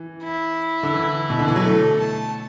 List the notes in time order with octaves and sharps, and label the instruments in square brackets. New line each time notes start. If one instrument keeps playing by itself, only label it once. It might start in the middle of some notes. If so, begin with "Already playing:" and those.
Already playing: [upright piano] E3
[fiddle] E4
[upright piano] D3
E3
B2
D3
E3
F#3
[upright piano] A3 [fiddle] A4
[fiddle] A5